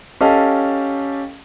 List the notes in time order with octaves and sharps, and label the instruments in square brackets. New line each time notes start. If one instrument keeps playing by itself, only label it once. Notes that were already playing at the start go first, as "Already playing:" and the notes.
[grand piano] C#4 G4 A4 D#5 F5 A5